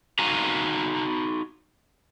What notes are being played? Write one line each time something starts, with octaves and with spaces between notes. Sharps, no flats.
D#4 F#4 F5 G#5 A#5